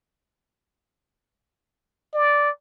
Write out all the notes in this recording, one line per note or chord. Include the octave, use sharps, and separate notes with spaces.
D5